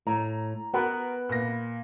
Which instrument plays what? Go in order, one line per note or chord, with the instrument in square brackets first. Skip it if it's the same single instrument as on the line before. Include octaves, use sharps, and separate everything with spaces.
[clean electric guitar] A2 [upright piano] A#5
[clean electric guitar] B3 [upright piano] F#4 A#4 B4
[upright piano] A#2 A#6